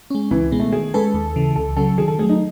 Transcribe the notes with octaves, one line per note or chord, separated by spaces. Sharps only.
G#3 C#4
C#2 E3
B2 G#3 B3
A3
D#3 G#4
G#3 C#4 G#4 A4 B4
D#2
C#3 E3
C#2 A4
C#3 F#3 C#4 A4
D#3 G#4
A4
F#3 A3 G#4
D#4